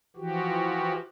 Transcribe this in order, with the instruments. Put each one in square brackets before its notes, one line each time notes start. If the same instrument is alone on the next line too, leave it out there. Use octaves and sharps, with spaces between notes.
[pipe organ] E3 F3 F#4 G4